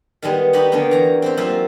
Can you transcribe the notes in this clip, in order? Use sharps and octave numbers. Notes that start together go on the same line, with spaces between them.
D#3 G3 G#3 B3
D#4 F#4 G4 D#5 B5
D3 A#3 B3 C#4 D4
E2 A#5
C4 G4 C5
F#2 A#3 F4 C5 E5